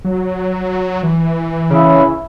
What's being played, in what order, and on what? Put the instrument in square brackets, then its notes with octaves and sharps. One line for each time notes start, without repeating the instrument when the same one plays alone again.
[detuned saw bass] F#3
E3
[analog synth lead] C#3 [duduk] E4